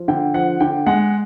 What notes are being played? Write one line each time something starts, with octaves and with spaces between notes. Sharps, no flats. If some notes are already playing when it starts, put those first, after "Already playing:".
Already playing: F3
D3 G5
F3 F#5
D3 G5
G#3 F#5